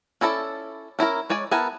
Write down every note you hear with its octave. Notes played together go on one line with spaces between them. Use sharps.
C#4 E4 A4 A#4 D5
C#4 E4 F4 A#4
G#3 C#5 D5 G#5
B3 E4 A#4 G#5 A5